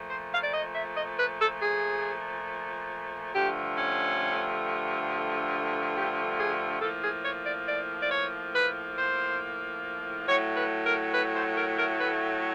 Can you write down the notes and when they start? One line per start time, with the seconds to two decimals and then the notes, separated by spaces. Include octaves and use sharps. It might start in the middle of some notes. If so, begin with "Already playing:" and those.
Already playing: A#2 F3 A3
0.09 C5
0.32 F5
0.43 D5
0.53 D#5
0.75 E5
0.96 D#5
1.18 B4
1.40 A4
1.61 G#4
3.34 G2 D3 F3 A3 G4
3.78 C#4
5.95 G4
6.38 G#4
6.81 A2 F3 A#3 A4
7.03 G#4
7.24 C#5
7.46 D5
7.68 D5
8.02 D5
8.11 C#5
8.54 B4
8.98 C5
10.27 A2 F#3 A3 C#5
10.56 B4
10.86 A#4
11.13 B4
11.36 C5
11.57 A#4
11.79 A#4
12.00 B4